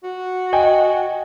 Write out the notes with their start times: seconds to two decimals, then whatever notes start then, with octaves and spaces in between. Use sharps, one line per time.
0.04 F#4
0.53 D#5 G5 G#5